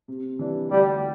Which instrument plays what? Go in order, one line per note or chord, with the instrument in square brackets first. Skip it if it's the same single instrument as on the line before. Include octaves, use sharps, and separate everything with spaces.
[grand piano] C3
E3 G3 D4
[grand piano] D2 [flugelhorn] G3